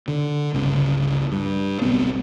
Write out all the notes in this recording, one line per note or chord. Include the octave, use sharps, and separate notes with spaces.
D3
G1 C#2 C#3
G2
D1 B1 B3 C4